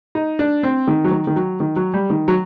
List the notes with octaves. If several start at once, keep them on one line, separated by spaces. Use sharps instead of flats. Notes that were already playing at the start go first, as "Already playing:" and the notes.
D#4
D4
C4
D#3
F#3
D#3
D#3
F#3
D#3
F#3
G3
D#3
F#3